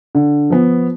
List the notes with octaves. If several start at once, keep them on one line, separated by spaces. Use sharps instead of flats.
D3
F3 B3